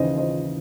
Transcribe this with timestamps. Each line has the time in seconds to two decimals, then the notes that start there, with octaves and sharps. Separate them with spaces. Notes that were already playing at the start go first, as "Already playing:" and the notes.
Already playing: D#2 C#3 E3 C5 D#5
0.17 C5 D#5